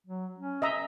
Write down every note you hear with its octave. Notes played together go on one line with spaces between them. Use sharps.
F#3
C#4
D#5 E5 A#5